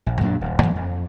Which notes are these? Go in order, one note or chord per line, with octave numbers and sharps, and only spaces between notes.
A#1
F#2 A#2 F#3 D4
D#1
G2 E3 F#3 A#3
F2